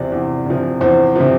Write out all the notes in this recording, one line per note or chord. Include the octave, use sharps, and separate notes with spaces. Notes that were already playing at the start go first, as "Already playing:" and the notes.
Already playing: E2 C3 F3 C5 D5
E2
C3 F3
E2 C5
C3 F3